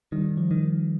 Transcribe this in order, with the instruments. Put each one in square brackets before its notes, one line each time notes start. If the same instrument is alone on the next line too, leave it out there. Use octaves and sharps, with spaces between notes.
[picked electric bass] D#3 [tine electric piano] G3
[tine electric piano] F3
[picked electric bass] D#3